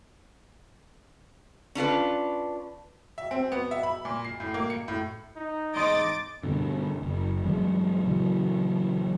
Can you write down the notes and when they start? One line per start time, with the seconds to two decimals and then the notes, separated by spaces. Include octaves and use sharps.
1.75 C#4 D4 F4 B4
3.18 E5
3.31 C4
3.52 B3
3.71 E5
3.83 B5
4.05 A#2
4.25 C7
4.40 A2
4.54 A#3
4.70 C#7
4.88 A2
5.37 D#4
5.75 E2 G#2 D#5 C6 D6 A6
6.43 G2 B2 D3
7.02 F#1
7.44 G2 E3 F#3 G#3
8.04 A#2 C#3 E3 F#3